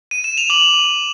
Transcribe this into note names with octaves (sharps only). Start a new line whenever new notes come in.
D#7
E7
F7
D6 F#7